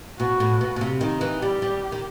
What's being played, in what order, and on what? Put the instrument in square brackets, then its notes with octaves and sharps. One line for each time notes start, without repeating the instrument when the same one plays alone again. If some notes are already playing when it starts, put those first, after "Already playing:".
[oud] B2 [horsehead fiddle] F#4
[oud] A2
B2
B2
C3
[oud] D#3 [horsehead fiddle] D#4
[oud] E3
[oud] G3 [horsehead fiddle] G4
[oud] G3
D#3